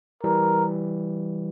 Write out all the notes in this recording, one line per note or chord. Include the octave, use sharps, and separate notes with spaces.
E3 G3 A#4